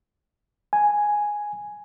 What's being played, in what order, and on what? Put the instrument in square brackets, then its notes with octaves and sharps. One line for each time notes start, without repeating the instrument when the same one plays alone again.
[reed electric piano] G#5